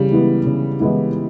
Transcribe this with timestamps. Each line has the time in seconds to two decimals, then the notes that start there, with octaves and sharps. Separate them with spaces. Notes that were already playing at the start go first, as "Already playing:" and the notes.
Already playing: C#3 E3 G3
0.11 E3 G#3 B3 E4
0.46 C#3
0.80 E3 G#3 B3 E4